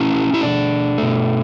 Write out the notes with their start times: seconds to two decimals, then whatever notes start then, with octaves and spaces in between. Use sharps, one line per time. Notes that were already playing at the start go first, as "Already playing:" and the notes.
Already playing: B2 A3 C#4 E4
0.34 E4
0.41 D4
0.98 B2 A3